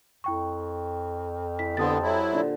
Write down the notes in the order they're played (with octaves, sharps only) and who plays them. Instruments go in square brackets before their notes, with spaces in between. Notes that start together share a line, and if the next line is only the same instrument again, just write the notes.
[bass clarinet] F2 [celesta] E4 G5 C#6
[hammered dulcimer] E3 [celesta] B6
[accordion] D3 B3 [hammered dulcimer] G4 A4 C5 [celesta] C6 D#6 A6
[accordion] F#3 E4
[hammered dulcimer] A#2 D3